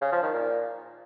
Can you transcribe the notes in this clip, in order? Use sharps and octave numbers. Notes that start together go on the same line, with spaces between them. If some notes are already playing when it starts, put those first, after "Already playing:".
C#3
F3
D#3
A#2